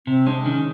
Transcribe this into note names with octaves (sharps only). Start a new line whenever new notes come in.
C3 C4
G#3 D4
D#3 C#4